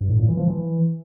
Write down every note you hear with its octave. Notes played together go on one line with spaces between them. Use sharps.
G2
A2
A#2
E3
F3
E3